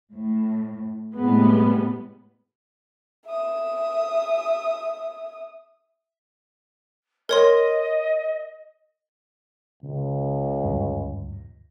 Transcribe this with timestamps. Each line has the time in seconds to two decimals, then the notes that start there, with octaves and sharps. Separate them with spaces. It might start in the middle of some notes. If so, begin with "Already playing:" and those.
0.13 A2
1.14 A2 C3 G3 G#3 B3
3.26 E5 D#6
7.29 A#4 C#5 D#5 C6
9.83 C#2 C#3
10.63 D2 G2